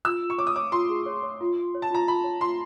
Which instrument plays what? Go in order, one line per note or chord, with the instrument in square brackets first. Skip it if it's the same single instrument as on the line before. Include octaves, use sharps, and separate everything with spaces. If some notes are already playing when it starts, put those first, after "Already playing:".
[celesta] F4 [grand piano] E6
[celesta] F4
[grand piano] C#6
[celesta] C#5 [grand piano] D6
[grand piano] D#6
[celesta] C#5 [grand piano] D6
[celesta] F4 [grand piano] C6
[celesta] G#4
C#5
C#5
F4
F4
C#5
[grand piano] A5
[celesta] F4 [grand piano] A#5
[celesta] F4 [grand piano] B5
[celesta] C#5
[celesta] F4 [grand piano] C6